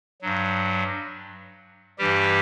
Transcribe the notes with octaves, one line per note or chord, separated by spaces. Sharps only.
G2 F#3
G2 E3 G3 G4